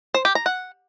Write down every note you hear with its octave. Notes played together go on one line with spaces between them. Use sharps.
C5
G4
A#5
F#5